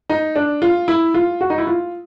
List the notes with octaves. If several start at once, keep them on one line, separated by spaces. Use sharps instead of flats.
D#4
D4
F4
E4
F4
F#4
D#4
E4
F4